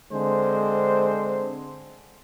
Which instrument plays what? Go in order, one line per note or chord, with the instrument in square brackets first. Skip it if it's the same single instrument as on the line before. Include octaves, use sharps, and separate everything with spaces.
[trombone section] D3 G#3 C4 C5